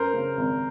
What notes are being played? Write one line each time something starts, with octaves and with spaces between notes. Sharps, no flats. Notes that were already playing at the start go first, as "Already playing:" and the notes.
Already playing: F#2 A#4 C5
C#3
G#1